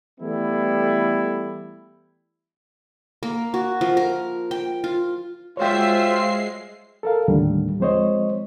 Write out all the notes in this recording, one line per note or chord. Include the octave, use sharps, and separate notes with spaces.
E3 G3 A3 B3 E4
A#3
F#4
F3
A#4
G5
F4
G#3 F4 F#4 C5 C#5 E5 G5 C7
A4 A#4 F5
D#2 A2 D3 G3
F3 G#3 C4 C5 C#5 D#5